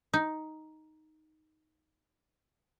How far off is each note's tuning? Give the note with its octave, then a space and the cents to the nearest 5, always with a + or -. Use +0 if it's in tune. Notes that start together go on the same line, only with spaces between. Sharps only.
D#4 +5